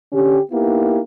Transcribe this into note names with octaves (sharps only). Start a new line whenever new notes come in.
D3 C#4 G4
A#3 B3 D#4 E4 G4